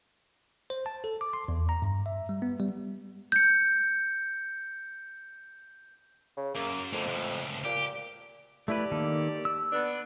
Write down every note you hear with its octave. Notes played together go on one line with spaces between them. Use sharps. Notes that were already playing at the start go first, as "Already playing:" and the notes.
C5
A5
A4
D6
C6
E2
A#5
G2
E5
G3
B3
G3
G6 C#7
C#3
F#2 A#3
F2 A2 D3
C#2 A2
A#2 G4
A3 E4 G4 B4 D5
D#3 A#3 A4
E6
B3 D4